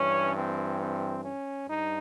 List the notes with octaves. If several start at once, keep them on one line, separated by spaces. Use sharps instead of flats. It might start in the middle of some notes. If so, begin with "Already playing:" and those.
Already playing: G2 E3 C#4
C4
C4
C#4
G2 D#4